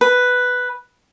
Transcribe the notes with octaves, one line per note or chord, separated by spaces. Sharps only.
B4